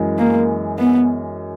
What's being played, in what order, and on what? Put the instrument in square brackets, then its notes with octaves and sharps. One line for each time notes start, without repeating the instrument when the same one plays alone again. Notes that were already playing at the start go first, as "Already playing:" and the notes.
Already playing: [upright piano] F#2 E3 G#3
[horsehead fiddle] A#3
B3